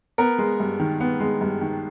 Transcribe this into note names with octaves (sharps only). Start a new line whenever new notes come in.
B3 A#4
G#3
G2
D#3
B3
G#3
G2
D#3